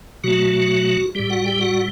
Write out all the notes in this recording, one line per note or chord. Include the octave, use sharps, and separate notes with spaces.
B2 F#3 A3 F#4
A2 G3 G4
F#4 F#5
G4 G5
F#4 F#5